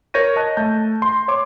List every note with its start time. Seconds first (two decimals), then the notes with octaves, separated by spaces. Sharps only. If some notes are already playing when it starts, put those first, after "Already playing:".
0.14 A#4 C#5 G6 A#6 D#7
0.36 D#5 A5 F#6
0.57 A3 A5 G6
1.02 C6
1.28 C#5 C6 D6